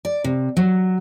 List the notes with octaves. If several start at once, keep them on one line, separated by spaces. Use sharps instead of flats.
D5
C3
F#3